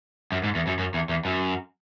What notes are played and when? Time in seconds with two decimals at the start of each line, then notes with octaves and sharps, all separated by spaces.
0.32 F#2
0.44 G#2
0.55 E2
0.67 F#2
0.79 F#2
0.94 E2
1.09 E2
1.25 F#2